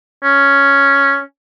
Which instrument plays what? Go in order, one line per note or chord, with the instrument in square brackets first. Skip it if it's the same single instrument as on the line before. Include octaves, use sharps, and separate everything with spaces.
[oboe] C#4